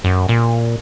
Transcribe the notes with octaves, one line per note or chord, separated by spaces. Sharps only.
F#2
A#2